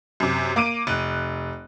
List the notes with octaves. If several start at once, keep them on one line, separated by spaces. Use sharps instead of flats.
F#2 C3
A#3 D6 D7 D#7
F1 F#6